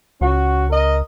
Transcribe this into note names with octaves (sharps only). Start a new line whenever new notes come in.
C#2 C#4 F#4
A#4 D#5